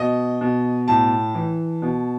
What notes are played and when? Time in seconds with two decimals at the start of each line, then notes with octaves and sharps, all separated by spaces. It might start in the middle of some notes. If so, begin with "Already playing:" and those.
Already playing: B2 D#5
0.41 B2
0.88 A2 A5
1.35 E3
1.82 B2